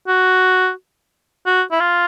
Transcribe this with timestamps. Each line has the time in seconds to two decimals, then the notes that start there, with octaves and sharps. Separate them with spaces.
0.07 F#4
1.46 F#4
1.71 E4
1.80 F4